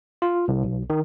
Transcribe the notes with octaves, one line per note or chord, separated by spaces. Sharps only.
F4
C2
B1
D#3